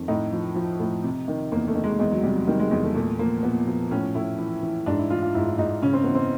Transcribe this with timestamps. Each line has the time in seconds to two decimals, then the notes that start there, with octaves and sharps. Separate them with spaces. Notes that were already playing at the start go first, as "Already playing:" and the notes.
Already playing: F2 D#3
0.08 A2 D#4
0.33 F3
0.55 F3
0.80 A2
1.04 C3
1.28 D#3
1.52 E2 A#3
1.68 A3
1.75 D#3
1.84 G#3
1.99 E2 G#3
2.11 F#3
2.23 C3 G3
2.35 F#3
2.47 D#3 G3
2.60 G#3
2.71 E2 G#3
2.83 A3
2.95 A#2 A3
3.19 F3 A#3
3.43 A#2 B3
3.67 F3
3.91 A2 C#4
4.15 A2 E4
4.39 E3
4.63 E3
4.86 G#2 D4
4.99 E4
5.10 E3 F4
5.22 F4
5.34 G#2 E4
5.47 E4
5.58 G#2 D#4
5.82 C#3 C#4
5.93 C4
6.04 E3 B3
6.15 C4